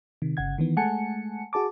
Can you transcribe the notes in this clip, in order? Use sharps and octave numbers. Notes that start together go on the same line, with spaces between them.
C3 D#3
G1 C#3 F#5 G#6
D#3 E3 B3
G#3 A3 F#5 G#5 A5 C#7
F#4 G#4 A5 D6